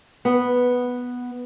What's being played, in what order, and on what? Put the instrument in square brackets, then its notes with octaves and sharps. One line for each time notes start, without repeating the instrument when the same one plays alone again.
[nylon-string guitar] B3